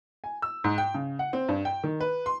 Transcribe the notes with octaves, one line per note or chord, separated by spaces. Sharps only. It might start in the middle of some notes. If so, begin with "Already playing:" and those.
G#5
E6
G#2
G5
C#3
F#5
C4
G2
G5
D#3
B4
C6